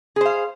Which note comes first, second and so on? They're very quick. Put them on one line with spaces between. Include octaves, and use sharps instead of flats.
G#4 C5 F5